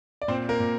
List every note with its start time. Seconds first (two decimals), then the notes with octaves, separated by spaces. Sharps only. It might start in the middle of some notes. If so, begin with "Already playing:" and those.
0.22 D5
0.28 A#2 C4 C5
0.49 A#3 A#4
0.60 A#2